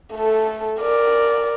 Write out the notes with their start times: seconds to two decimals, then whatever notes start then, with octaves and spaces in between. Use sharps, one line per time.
0.14 A3 A4
0.81 A#4 D5